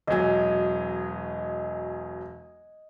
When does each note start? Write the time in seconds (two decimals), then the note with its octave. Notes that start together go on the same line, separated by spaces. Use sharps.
0.07 E1 F#3 D#5 G#5